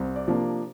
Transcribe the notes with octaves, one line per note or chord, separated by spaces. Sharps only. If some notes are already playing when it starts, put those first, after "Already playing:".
Already playing: C2 C4
D5
C3 F3 A#3 D4